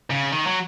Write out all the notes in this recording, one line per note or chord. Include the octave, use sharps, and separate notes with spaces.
C#3
D#3
F#3